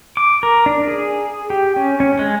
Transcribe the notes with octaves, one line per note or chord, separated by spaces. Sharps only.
D6
A#4
D4
G#4
G4
C#4
C#4
G#3